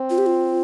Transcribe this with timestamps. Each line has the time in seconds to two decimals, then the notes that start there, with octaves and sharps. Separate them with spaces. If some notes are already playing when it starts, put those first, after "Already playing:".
Already playing: C4
0.10 F4
0.18 G4
0.26 F4